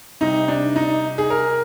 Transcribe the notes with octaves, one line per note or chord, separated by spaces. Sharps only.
C3 G3 D#4
D4
D#4
G#4
A#4